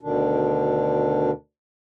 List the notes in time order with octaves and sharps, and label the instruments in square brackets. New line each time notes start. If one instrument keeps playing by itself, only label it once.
[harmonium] D2 B2 D3 D#3 D4